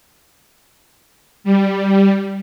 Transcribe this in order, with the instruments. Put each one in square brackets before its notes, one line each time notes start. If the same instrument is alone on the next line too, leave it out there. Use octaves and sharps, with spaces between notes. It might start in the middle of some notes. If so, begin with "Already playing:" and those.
[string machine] G3